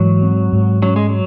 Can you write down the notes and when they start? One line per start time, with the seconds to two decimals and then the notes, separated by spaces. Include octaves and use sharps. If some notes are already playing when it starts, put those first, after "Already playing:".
Already playing: G#2 E3 F#3
0.22 C4
0.53 G#2
0.82 F#3 C#4
0.96 G#3
1.09 F#3